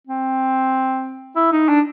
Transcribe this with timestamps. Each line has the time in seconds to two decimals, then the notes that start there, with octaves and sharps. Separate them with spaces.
0.07 C4
1.36 E4
1.52 D#4
1.69 D4